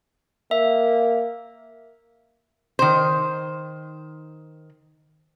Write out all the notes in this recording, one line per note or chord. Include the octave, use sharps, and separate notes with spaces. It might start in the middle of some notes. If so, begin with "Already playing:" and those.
A#3 E5
D#3 C5